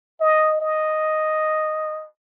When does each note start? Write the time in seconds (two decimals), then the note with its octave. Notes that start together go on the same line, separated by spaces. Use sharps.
0.20 D#5
0.61 D#5